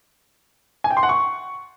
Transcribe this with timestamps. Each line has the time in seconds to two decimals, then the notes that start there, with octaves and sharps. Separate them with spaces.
0.84 G#5
0.91 G5
0.97 C6
1.03 F#5
1.09 C#6